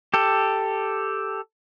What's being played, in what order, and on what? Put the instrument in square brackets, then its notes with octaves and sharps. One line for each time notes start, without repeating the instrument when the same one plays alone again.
[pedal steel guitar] G4 A4